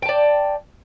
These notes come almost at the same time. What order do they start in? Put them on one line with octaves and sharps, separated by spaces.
G5 A5 D5